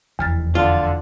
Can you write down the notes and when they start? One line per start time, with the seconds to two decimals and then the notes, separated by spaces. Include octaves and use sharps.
0.19 F1 E2 E3 F6 A6
0.55 D3 F4